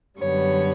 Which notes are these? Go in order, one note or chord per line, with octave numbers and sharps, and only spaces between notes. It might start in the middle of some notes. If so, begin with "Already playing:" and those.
F#2 D3 G3 B3 C#5